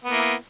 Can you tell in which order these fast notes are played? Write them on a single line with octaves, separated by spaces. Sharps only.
B3 A#3 E4